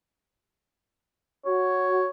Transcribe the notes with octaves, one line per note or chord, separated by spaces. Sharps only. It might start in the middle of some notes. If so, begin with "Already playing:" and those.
F#4 C#5